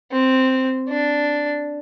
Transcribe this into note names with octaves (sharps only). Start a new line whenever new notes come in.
C4
D4